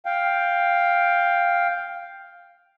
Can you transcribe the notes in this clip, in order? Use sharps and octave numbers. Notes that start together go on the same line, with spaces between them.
F5 G5